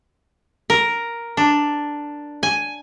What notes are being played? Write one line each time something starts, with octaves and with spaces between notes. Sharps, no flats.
A#4
D4
G#5